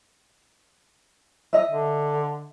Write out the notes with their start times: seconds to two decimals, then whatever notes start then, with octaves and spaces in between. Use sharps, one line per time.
1.53 D#5 E5
1.71 D3